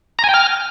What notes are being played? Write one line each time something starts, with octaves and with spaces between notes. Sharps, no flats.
A#5
G#5
G5
F6